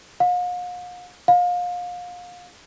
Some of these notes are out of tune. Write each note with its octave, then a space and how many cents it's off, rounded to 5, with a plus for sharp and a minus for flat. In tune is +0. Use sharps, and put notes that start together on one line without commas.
F5 +45
F5 +30